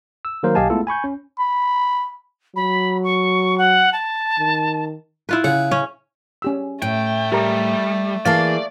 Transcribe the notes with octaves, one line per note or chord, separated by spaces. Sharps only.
E6
D#3 F#3 A#3 A#4 C5
B1 G4 D#5 F5 G#5 A5
G#3 A3 B3 E4 F4 A4
G#5 B5 C#6 G6
C#4
B5
F#3 B5
C#6
F#5
A5
D#3
E4 F4 B4
C#3 F#5
C#4
C#4 G4 E6
A2 A3 G5
G3 G4 A#4 A#5
E3 A#3 G#4 D5 F5 A5